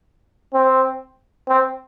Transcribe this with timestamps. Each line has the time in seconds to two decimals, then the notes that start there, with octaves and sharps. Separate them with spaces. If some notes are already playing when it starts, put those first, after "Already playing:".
0.54 C4
1.49 C4